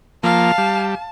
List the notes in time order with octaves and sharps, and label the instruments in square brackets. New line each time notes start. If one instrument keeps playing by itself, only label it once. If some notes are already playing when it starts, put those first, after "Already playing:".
[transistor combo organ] F3 A#3 [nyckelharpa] F5 [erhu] A5
[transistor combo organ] G3